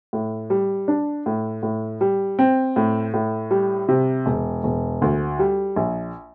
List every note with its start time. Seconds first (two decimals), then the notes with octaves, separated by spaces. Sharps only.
0.13 A2
0.50 G3
0.88 D4
1.26 A2
1.63 A2
2.01 G3
2.39 C4
2.76 A2
3.14 A2
3.51 G3
3.89 C3
4.26 E1
4.64 E1
5.02 D2
5.39 G3
5.76 A#1